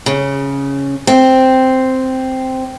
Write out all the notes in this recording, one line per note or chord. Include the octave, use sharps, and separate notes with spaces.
C#3
C4